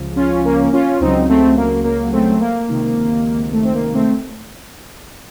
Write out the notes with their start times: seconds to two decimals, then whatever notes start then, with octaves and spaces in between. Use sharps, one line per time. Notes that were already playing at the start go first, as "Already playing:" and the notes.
Already playing: C#2 C#3 F3
0.16 C#4 F4
0.45 A#3 C#4
0.73 C#4 F4
1.00 C#2 C#3 F#3 C4 D#4
1.29 A3 C4
1.57 A#3
1.84 A#3
2.12 A3 C4
2.40 A#3
2.68 C#2 C3 D#3
3.52 A3
3.64 C4
3.73 A#3
3.94 A3 C4